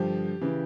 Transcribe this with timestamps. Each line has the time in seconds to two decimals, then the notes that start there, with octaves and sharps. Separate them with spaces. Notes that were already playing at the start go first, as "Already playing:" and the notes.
Already playing: G2 D3 F3 G4
0.41 C#3 E3